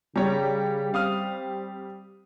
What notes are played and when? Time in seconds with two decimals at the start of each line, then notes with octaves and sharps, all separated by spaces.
0.16 C#3 G3 G4 C#5 A#5
0.94 C4 F5 D#6 F6